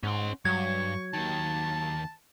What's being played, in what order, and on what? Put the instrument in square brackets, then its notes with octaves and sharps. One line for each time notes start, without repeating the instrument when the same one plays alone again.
[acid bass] G#2 [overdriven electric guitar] C#4 C6 [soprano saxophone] F#5
[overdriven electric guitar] G2 [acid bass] F#3 [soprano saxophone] C#6 [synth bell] G#6
[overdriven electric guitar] D#2 D#3 [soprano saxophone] A5